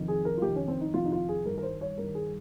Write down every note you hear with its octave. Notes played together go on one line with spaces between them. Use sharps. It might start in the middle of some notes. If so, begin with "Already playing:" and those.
Already playing: F2 C3 D#3
G#4
A#4
F4
F2 C3 D#3 G4
C#4
C4
D#4
F2 C3 D#3 F4
D#4
F4
G#4
G2 D#3 A#4
A#4
C5
C#5
G2 D#3 A#4
G#4